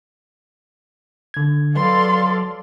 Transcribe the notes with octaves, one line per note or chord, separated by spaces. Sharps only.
D3 G#6
F#3 A4 B4 D5 F5 C6